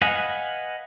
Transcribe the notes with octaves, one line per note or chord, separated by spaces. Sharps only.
B4 D#5 F5 F#5 G#5